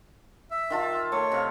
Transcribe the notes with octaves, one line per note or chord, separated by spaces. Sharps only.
E5
D#3 F4 A5
A3 C#5
C3 F5